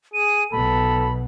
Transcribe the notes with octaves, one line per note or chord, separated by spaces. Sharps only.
G#4 D#7
B1 B2 A4 B5